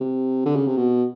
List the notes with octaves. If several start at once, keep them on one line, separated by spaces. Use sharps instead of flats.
C3
D3
C#3
C3
B2